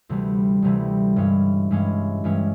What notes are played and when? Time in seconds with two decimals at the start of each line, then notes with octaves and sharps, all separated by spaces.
0.09 D2 C3 E3 G3
0.62 D2 C3 E3 G3
1.16 G2 E3 G#3 C#4
1.71 G2 E3 G#3 C#4
2.24 G2 E3 G#3 C#4